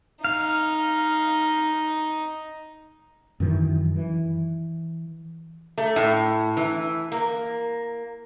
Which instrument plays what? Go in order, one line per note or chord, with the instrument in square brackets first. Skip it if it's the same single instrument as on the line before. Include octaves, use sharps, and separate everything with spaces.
[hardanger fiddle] D#4 [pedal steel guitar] F5
[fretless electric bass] F#2 D#3 E3
E3
[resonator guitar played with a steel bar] A3
A2
E3
A#3